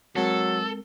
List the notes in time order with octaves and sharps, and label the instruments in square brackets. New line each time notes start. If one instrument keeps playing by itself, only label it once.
[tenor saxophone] F#3 [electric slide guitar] G#3 C4 A#4 [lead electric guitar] A4